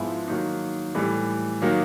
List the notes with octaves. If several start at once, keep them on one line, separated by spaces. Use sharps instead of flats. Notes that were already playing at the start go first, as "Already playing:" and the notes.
Already playing: G#2 F3 G#3 B3 E4
D#3 F#3 A#3 D#4
A2 E3 G3
D#3 F#3 A#3